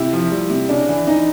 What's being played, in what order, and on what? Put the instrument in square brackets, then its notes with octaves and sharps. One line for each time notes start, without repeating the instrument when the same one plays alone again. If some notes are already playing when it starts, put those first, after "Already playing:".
Already playing: [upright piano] C3 [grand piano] E4
[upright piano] F3
G3
C3
[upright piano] C#3 [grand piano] D4
[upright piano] E3
[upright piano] E3 [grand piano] D#4